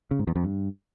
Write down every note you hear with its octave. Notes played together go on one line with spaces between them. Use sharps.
C#3
G#2
E2
F2
G2